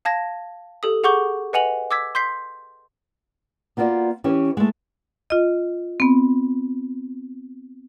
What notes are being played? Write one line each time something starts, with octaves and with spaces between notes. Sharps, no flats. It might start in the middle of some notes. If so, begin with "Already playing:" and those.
F5 A5 G#6 A#6
G4 A4 D#6
G#4 F#5 C#6 D6 G6 G7
B4 D#5 F#5 G#5 F7 F#7
D6 E6 G#6 B6
C6 G6 B6 C7
A#3 B3 F4 F#4 D5
E3 C#4 G4 C#5
G#3 A3
F4 D#5
B3 C4